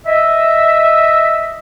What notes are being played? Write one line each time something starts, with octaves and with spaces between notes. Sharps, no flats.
D#5 E5